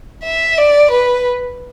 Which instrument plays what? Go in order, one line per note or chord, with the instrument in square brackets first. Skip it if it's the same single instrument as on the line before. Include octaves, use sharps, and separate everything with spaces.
[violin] E5
D5
B4